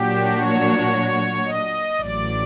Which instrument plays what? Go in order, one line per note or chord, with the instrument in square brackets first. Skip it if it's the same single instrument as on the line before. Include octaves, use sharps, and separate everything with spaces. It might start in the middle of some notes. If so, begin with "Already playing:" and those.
Already playing: [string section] A#2 F#3 A#3 D4 F#4 [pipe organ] G4
[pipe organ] C#5
D#5
[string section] A1 A2 F#3 [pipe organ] D5